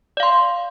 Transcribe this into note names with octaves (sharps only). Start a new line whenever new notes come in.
D5 F5 C6